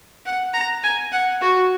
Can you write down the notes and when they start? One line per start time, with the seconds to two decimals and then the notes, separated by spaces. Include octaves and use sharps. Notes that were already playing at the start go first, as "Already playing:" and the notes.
0.26 F#5
0.54 A#5
0.83 G#5
1.12 F#5
1.41 F#4